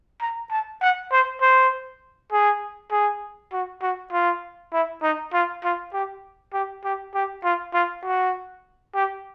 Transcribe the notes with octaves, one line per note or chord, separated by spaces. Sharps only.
A#5
A5
F#5
C5
C5
G#4
G#4
F#4
F#4
F4
E4
D#4
F4
F4
G4
G4
G4
G4
F4
F4
F#4
G4